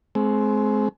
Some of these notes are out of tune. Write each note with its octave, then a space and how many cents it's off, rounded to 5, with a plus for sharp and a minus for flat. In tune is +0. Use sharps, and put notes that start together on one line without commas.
G#3 +35 C4 +0